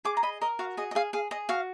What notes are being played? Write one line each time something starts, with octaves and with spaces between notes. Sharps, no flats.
G#4 D6
A#5
D#5 B5
A#4 D#5
F#4 F5
G#4 D#5
D#5
G#4 F5
G#4 F5
G#4 D#5
F#4 F5